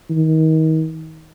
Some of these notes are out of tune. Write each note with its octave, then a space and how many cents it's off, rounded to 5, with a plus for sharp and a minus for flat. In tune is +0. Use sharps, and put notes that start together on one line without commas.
D#3 +30